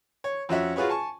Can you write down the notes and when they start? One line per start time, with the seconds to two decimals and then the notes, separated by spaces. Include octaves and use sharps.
0.24 C#5
0.49 F2 C#4 F#4 E5 F#5
0.76 F4 F#4 G#4 B4 C#5
0.89 G#5 A5 C#6